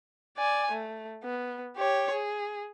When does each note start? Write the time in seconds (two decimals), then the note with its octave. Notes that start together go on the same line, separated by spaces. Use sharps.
0.37 D5 G#5
0.72 A3
1.23 B3
1.77 G4 C#5
2.13 G#4